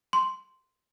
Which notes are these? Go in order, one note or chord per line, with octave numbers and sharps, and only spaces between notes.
C6